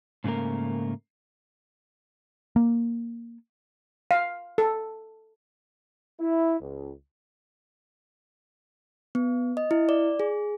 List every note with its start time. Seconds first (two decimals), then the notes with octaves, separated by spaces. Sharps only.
0.24 G#2 C#3 A3 A#3 A#4
2.56 A#3
4.11 F5
4.58 A4
6.19 E4
6.60 C#2
9.15 B3
9.57 D#5
9.71 E4
9.89 D5
10.20 G#4